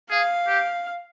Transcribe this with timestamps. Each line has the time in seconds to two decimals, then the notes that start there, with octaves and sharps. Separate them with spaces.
0.10 G#4 F5
0.47 G4